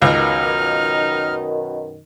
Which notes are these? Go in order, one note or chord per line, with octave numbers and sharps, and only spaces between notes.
C#2 F#2 B2 D#3 D#4 F6